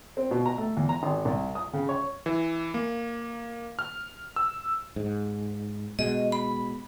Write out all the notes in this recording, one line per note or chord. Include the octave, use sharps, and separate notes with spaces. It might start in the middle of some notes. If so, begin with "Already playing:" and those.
C4
B2
A#5
A3
E2
A#5
G#1
C2
D#6
C#3
C#5
E3
A#3
F6
E6
G#2
B2 G#3 D#5
B5